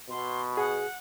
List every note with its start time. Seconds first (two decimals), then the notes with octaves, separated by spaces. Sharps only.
0.10 B2 C6
0.57 G#4 F#5